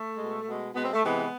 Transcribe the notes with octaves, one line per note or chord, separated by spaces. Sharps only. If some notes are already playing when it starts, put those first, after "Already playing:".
Already playing: A3
B2 G#3
B2 G#3
B2 G#3 B3
C4
A3
C3 E3 G#3 B3